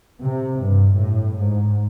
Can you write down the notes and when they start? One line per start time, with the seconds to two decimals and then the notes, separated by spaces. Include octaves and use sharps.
0.22 C3
0.62 G2
0.97 A2
1.40 G#2